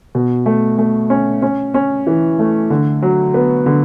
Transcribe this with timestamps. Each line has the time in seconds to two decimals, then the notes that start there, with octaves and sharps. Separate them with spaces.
0.15 B2
0.46 A3
0.78 A3
1.10 C#4
1.42 C#4
1.74 C#4
2.07 E3
2.39 A3
2.70 D3
3.02 F#3
3.34 B3
3.66 D3